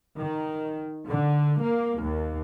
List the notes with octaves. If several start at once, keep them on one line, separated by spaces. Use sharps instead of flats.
D#3
D3
A#3
D#2